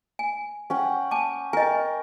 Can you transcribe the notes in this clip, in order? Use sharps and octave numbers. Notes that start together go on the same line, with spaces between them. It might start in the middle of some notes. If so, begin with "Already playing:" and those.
G#5
C#4 F#5 G5
G#5 A5 D6
A#4 D#5 G5 G#5